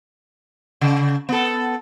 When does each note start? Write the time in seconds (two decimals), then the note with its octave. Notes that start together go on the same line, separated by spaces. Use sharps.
0.81 C#3
1.29 B3 A4